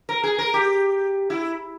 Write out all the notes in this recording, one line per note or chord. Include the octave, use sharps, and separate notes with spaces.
A#4
G#4
A#4
G4
E4